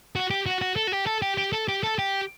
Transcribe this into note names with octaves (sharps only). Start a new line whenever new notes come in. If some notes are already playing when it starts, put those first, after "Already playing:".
F#4
G4
F#4
F#4
A4
F#4
G4
A4
G4
G4
A4
G4
A4
G4